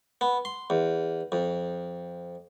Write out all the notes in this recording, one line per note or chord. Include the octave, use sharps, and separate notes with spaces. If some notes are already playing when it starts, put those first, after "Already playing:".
B3
C6
E2
F2